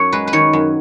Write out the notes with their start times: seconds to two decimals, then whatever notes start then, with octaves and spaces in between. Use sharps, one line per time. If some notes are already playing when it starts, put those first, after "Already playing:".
Already playing: F#2 C#5
0.12 G#3 B4
0.27 B4
0.33 D#3 C#5
0.53 F#2